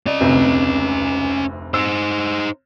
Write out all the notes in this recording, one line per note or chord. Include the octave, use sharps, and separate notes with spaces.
C#4 D5 D#5
F1 D2 C3
D#4 C5 E6